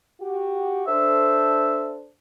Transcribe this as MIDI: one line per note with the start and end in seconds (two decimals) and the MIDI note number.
0.21 0.83 66
0.21 0.83 67
0.88 2.06 62
0.88 2.06 69
0.88 2.06 72
0.88 1.93 76